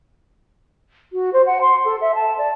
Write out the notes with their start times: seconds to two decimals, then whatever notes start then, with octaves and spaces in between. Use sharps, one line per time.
1.13 F#4
1.33 C5
1.46 F#5
1.61 C6
1.85 A4
2.01 E5
2.15 A5
2.38 D5